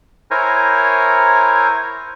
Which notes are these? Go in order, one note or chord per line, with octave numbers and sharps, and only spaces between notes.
E4 A#4 C5 C#5 G#5 A#5